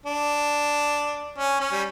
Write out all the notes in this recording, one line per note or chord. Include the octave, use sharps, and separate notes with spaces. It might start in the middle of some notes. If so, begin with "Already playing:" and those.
D4
C#4
C#4
G3